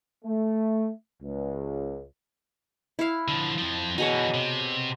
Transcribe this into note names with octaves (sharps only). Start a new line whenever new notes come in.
A3
C#2
E4 F5
D3 F3
F2 F3
B2 E3 D#4 G#4 C#5
C3